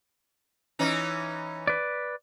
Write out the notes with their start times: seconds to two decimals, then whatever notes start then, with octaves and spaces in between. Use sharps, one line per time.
0.79 E3 C#4 D#4
1.67 B4 D5